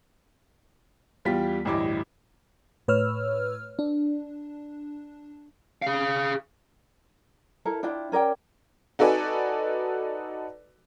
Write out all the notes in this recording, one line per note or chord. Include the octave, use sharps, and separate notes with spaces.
E2 G3 F4 G4 G5 B6
A1 D2 G2 E4 D#5 D6
A2 B4 C#5 E6 F6
D4
G#4 F5
E4 A4 A#4
D4 E4 F4 G5
C#4 A#4 D5 G5
D#4 F#4 A4 B4 D5 G#5